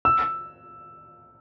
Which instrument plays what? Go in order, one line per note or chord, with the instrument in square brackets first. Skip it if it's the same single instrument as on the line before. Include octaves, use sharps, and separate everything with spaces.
[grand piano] E6